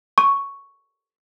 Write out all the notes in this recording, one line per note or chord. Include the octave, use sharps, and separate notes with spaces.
C#6